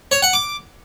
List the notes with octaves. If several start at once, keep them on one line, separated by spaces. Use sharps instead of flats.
C#5
F#5
D6